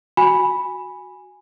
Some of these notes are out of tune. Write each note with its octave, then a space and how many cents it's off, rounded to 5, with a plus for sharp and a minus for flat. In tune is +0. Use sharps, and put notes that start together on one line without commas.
F#4 +0 G#5 -5 B5 -5